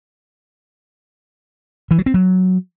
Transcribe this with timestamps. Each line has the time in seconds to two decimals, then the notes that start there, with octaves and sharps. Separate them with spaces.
1.91 E3
1.99 F#3
2.06 C4
2.14 F#3